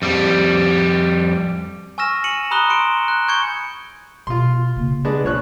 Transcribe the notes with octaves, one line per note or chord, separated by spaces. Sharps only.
F2 G3
G#5 C#6 E6 F6 A#6 E7
C#7 D#7 F#7
A#5 B5 D#6 F#6 E7 G7
C6 C#7 D7
F#6
C#6 G6 G#6 C#7 G7
B2 F4 C6
C#3 A#3
G#3 B3 D4
B1 F3 C#5 F#6